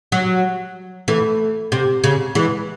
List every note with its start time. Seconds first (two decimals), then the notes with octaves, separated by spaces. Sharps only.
0.12 F#3
1.08 E3 A3
1.72 C3
2.04 C#3
2.35 E3 G#3